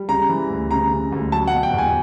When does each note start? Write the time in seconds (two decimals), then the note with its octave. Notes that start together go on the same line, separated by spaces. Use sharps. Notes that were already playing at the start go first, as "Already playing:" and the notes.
Already playing: G3
0.09 C#3 A#5
0.29 E3
0.50 D2
0.71 C#3 A#5
0.91 C#3
1.12 D2
1.32 F#3 A5
1.48 F#5
1.53 B2
1.63 G5
1.73 E2
1.78 G#5